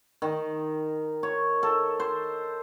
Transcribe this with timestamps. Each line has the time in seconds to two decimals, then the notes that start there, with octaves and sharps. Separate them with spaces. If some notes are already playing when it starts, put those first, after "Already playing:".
0.22 D#3
1.23 C#5
1.63 A4
2.00 C5